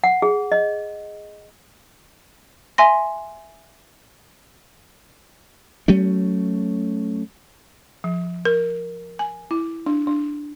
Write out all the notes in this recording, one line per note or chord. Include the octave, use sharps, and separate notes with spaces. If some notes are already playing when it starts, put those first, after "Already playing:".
F#5
G#4
D#5
E5 G#5 C6 A#6
F#3 A3 C#4
F3
A#4
G#5
E4
D4
D4